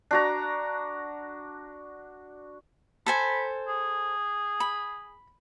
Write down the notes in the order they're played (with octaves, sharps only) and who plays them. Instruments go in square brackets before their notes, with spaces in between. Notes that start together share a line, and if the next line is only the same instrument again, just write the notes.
[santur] D4 F#4 A#5
[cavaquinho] A4 C5 G#5 [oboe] B5
[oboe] G#4
[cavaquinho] B5